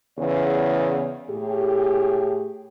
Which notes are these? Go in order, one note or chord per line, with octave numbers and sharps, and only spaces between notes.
E2 C#3 C#5
A2 G4 G#4